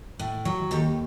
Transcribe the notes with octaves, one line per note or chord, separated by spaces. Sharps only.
A2
F#3
D#2 G4 A4